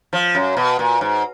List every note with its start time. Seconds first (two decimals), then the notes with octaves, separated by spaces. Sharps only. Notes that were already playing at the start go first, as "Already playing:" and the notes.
0.13 F3
0.35 F#2
0.57 B2
0.79 A#2
1.01 G#2